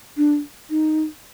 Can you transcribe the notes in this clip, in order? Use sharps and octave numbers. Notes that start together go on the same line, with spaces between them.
D4
D#4